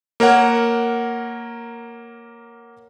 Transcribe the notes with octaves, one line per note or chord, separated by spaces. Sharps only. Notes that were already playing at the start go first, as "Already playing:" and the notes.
A#3 A#4 C#5 F#5